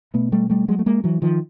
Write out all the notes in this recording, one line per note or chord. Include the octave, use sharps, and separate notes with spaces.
B2 A3 B3
G3 A3
G3 A3
F#3 G#3
A3
G#3 A#3
E3 F#3
D#3 F3